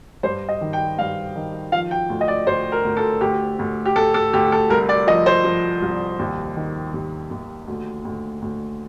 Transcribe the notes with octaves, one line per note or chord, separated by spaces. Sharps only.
G2 C5
D#5
D#3
G5
G2 F5
D#3
F3 F5
G5
D2
D#5
D5
D2 C5
A#4
D2
A4
D2 G4
D2
G4
D2 A4
A4
D2 G4
A4
C2 A#4
D5
F3 D#5
C5
F3
C2
D#2
D#3
D#2
D#2
D2
D2
D2